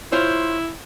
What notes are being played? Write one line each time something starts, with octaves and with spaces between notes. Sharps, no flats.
E4 F4 C5 C#5